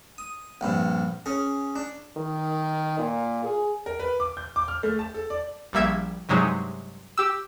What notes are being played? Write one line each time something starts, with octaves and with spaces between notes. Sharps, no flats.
D#6
A#1 G2 C3
C#4 G#4
D4
D#3
A#2
G#4
A#4
B4
D6
G6
D6
F6
A3
A5
A4
D5
A#1 G3 A#3 E5 G#6
G2 C3 F#3 G#3 D#4
G4 E6